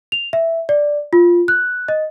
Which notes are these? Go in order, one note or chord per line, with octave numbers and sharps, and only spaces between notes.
F7
E5
D5
F4
F#6
D#5